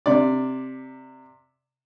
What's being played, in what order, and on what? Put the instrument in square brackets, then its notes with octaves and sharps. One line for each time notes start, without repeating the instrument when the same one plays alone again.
[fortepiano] C3 D5